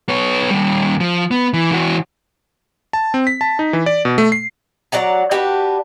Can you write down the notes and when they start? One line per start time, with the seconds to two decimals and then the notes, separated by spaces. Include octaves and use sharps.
0.09 B3 C#5
0.50 D#2 G3
1.00 F3
1.31 B3
1.53 E3
1.71 E3 F#4
2.93 A5
3.14 C4
3.27 B6
3.41 A5
3.59 D#4
3.73 E3
3.86 D5
4.05 B2
4.18 A3
4.32 C7
4.92 F#3 D5 F#5 A#5
5.31 D4 F#4 G4 B4